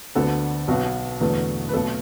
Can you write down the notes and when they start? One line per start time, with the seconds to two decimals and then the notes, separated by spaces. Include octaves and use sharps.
0.15 D2 D3 B3 A4
0.68 B1 B2 B3 F#4
1.20 E2 D3 F#3 A3
1.69 B4
1.73 B1 B2 A3 A4